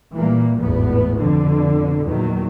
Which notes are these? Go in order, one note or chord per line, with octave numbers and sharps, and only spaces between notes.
A#2 E3 G3 A#3
G#1 E2 A2 B3
F2 B2 D3
E2 A#2 D#3 F#3